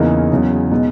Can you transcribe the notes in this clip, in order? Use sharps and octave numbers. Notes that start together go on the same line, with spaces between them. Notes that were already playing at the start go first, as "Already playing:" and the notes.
Already playing: E2 C#3 E3 A#3 D#4
E2 C#3 F#3
B2 G#3 D#4